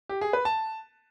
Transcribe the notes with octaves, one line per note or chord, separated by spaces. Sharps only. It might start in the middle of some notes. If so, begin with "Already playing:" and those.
G4
G#4
B4
A5